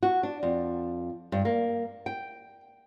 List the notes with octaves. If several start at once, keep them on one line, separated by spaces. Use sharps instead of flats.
F#4
D4
F2
G2
A#3
G5